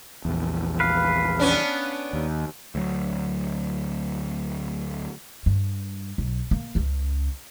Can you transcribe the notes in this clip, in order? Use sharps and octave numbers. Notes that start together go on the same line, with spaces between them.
A#1 E2
B4 F5
B3 C#4 D4
D#2
D2 F#3
G2
B1
A#3
C#2 C#4